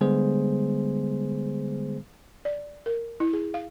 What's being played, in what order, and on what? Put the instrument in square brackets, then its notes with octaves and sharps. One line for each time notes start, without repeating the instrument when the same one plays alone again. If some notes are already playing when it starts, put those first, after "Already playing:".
[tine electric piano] D3 G3 G#3 B3 G#4 C5
[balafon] D5
A#4
E4
G#4
F5